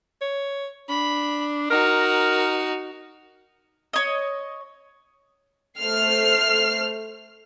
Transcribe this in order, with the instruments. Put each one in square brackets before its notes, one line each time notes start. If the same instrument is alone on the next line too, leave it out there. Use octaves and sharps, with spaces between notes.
[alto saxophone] C#5
[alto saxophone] D4 [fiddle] B5
[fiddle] D#4 F#4 [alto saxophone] A#4
[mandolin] C#5 D#5
[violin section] A3 C5 F6 C7